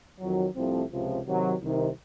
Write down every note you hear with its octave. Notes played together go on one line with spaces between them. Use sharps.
F2 D#3 F#3
C2 C3 F3 A3 C4
C#2 C3 F3
C3 D#3 F#3
C2 C3 D#3